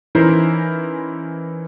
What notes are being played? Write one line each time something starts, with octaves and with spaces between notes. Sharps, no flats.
E3 C#4 D#4 E4 A#4 C5